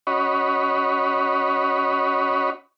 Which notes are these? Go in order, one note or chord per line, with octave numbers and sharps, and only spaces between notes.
C#4 F#4 C#5 D#5 B5